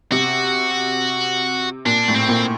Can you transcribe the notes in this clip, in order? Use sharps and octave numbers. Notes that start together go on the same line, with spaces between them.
C3 F#4
A#2 D4
A2
C4
A#2